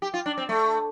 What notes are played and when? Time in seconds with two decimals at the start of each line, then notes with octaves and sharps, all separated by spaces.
0.02 G4
0.14 F4
0.26 D4
0.38 C4
0.49 A3